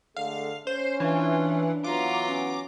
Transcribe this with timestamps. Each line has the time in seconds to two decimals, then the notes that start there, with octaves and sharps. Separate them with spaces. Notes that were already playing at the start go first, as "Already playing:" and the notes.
0.16 D3 G#3 A3 F5
0.67 C#4 C5
1.00 E3 D4 F4
1.84 E3 F#3 B3 F4 A#5 D6
2.29 C#4